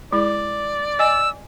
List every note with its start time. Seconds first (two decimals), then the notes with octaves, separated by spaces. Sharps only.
0.13 G#3 E4 G#4 D5
0.99 D#5 G#5 E6